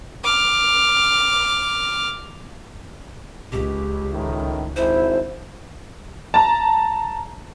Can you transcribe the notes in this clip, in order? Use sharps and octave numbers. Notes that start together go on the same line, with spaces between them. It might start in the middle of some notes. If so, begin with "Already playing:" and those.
D6 F6
C#2 G4
A2 D#3
G#1 E4 C5
A5 A#5